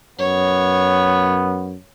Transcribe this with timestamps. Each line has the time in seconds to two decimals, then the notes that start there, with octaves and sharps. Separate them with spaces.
0.19 F#2 B3 C#5